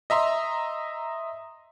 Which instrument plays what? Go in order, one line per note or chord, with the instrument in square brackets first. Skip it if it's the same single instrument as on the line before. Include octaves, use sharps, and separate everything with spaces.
[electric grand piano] D#5 E5 A#5 C6